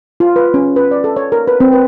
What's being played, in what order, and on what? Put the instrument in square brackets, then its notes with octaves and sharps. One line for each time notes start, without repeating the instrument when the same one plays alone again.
[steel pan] F4
B4
C#4
B4
D5
A4
C#5
A#4
B4
C4
B4